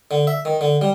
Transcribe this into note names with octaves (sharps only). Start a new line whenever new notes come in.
D3
E5
D#3
D3
G3